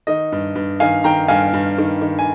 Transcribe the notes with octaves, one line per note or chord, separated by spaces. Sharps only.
D#3 D#5
G2
G2
D#3 F5 G#5
D#3 G5 A#5
G2 F5 G#5
G2
D#3
D#3
G#5